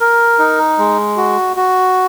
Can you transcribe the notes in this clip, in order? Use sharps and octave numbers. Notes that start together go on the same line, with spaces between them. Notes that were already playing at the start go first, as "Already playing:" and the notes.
A#4
D#4
G#3
F#4
F#4